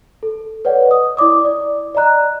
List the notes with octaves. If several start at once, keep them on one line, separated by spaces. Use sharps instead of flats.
A4
B4 C#5 D5 F#5
D#5 D#6
E4 D5 D6 D#6
D5
D5 D#5 A#5 F#6